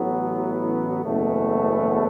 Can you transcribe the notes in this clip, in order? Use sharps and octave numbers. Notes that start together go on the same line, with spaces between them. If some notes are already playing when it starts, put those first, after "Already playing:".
Already playing: A1 A2 F#3 B3
F#1 E2 B2 A3